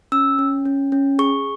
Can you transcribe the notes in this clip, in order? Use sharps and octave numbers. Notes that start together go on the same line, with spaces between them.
C#4 E6
C#4
C#4
C#4
G#4 C#6